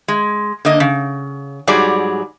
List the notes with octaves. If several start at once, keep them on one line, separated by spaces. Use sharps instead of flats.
G#3
D3 A#3 D#5
C#3
G#2 F#3 G3 G#4 D5